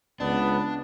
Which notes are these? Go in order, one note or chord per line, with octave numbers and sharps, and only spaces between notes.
C#2 B3 D4